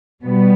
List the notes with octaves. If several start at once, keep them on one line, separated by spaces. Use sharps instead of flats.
B2 G3 B3